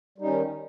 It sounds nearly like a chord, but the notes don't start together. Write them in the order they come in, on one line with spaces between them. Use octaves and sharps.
G3 D#4 C#4 D#3